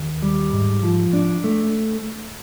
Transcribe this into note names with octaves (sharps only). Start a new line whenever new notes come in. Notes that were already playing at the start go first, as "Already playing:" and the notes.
Already playing: D#2
G3
G#2
F3
D4
A3